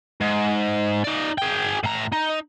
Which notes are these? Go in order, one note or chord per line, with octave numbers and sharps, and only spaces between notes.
G#2
D#4 D5
G#4 G5
A2 A#5
D#4